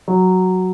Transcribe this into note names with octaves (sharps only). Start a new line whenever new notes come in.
F#3